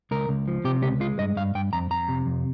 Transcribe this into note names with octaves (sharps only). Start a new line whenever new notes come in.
C#2 A#4
C#2
F3
C3 G4
C#2 G4
G#3 F4
G2 D#5
G2 F5
G2 G5
F2 A#5
F2 A#5
C3
F2